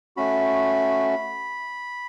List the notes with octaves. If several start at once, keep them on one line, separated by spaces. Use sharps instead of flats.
A3 C#4 F#4 B5